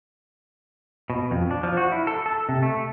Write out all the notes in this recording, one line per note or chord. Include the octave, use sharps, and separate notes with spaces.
B2
F2
D4
F3
F#4
E4
A4
A4
C3
A3